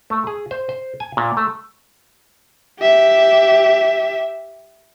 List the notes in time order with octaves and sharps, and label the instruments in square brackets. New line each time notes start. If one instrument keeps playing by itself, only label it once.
[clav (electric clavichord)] A3
G#4
C5
C5
G#5
A#2
A3
[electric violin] G4 E5